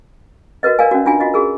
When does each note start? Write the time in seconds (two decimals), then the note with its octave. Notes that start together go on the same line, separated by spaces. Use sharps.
0.63 F#4 A#4 B4 D#5
0.79 A#4 D5 F5 G#5
0.91 C#4 F#4
1.06 D4 F4 F#4 G#5
1.20 F4 F#4 D#5
1.34 F#4 G#4 A#4